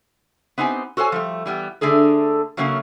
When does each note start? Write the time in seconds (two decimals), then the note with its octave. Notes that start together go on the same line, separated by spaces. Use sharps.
0.58 B3 C4 D#4 G4 G#5
0.97 F#4 A4 C5 C#5 G#5
1.12 F3 G3 A3
1.46 E3 G3 B3
1.81 D3 A3 D4 G#4 A4
2.57 C#3 F#3 A3 A#3 C#4